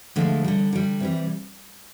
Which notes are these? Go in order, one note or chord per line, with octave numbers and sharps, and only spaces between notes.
D3 F3 G#3 A3
D3 G3
D3 G3
C3 E3 G3